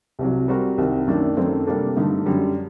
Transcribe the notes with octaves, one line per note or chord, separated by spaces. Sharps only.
C2 C3 F#3
G3 C4 F#4 A#4
C2 C3 D#3
F#2 D#3 A3 D4 A4
F#2 D#3 A3 C4
C3 G3 A#3 D4 A4
G2 D3 A3 D#4 A4
F#2 D3 G3